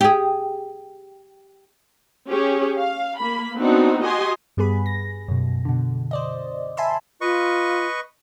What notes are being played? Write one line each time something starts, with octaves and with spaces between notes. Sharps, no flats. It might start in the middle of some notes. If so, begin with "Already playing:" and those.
G4 G#4
C#4 G4 G#4
F5
A#3 B5
B3 C4 D4 D#4 F#4
F#4 G4 D#5 G#5 C6
G2 G3 B3 G#4 B5
A#6
F#2 B2
B2 D3
C5 D5 D#5
E5 G#5 A5 B5 C6 E6
F4 B4 D#5 C#6